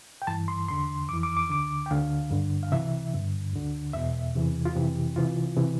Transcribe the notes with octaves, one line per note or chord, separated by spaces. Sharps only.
G5
G2 E3 A5
C6
E2 D3 C6
F2 E3 D6
D6
D6
D2 D3 D6
G5
D2 D3 F5
G2 D3
F5
C2 C3 E3 E5
G2 D3
D2 D3
E2 B2 E5
E2 C3 E3
F4
F2 C3 E3 G4
C2 C3 E3 F4
C3 E3